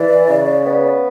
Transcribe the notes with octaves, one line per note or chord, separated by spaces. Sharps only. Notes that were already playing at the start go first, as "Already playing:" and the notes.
Already playing: E3 D5
C#3
B3